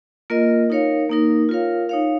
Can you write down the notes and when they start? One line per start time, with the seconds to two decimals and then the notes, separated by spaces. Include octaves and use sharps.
0.30 A#3 F4 A#4 D#5
0.70 D#4 A#4 C#5 F5
1.09 A#3 D#4 A#4
1.49 F4 A#4 C#5 F5
1.89 D#4 C#5 F5